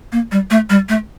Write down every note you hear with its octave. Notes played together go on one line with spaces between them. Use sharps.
A#3
G3
A3
G3
A3